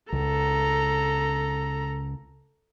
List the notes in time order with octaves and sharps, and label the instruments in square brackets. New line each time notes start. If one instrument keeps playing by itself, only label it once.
[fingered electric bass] C#2 [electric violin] A4 A#5